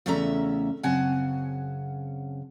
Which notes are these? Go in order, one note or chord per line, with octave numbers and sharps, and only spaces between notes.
E2 C#3 A3 C#4 E5 A#5
F#2 C#3 C4 F#5 G#5 A5